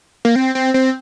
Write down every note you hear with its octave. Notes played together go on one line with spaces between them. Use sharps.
A#3
C4
C4
C4